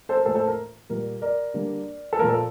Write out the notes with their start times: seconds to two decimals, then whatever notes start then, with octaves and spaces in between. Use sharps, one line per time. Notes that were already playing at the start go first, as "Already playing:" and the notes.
0.09 A4 C5
0.17 A#4
0.25 A2 F3 A#3 A4 C5
0.35 A4 C5
0.47 A#4
0.90 A#2 G3 A#3 A#4
1.22 A#4 D5
1.54 D3 G3 A#3
2.13 A4
2.19 A#2 F3 A#3 A#4
2.29 A4